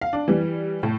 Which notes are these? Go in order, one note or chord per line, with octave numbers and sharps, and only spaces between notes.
F5
D4
E3 G3
A2